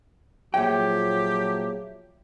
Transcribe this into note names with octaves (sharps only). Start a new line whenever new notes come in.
A#2 F3 F#3 G4 G#4 C#5 E5 G5